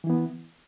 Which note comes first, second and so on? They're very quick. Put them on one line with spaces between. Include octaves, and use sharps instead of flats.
E3 E4 B3